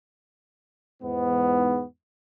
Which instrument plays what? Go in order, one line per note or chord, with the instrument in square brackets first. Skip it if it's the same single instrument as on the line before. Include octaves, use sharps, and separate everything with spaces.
[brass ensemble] E2 G#2 B3